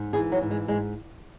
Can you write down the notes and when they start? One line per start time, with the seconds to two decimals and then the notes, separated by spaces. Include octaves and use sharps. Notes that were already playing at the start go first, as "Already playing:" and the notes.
Already playing: G#2
0.13 E3 G#4
0.32 F#3
0.42 G#2
0.51 G#3
0.68 G#2 G#3